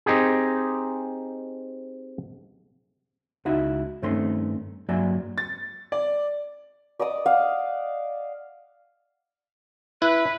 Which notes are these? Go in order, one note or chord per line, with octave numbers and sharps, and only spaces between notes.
C4 D#4 G4 G#4
C#2 D#4 E4 F#4 E5
G2 D#3 A3 C4 C#4 C6
G2 F#3 A#3 D5 E5 G#5
A6
D5
D5 D#5 D6 D#6
F5 F#5
E4 B4